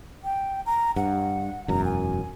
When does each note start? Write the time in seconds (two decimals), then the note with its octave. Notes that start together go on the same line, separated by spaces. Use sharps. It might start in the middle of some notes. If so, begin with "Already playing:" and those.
0.24 G5
0.66 A#5
0.96 G2 F#5
1.68 E1 F#2 A#5
1.85 G#5